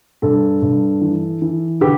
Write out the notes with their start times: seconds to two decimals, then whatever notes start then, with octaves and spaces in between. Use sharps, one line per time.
0.22 G2 A4
0.62 G2
1.01 E3
1.42 E3
1.81 D3 G4 B4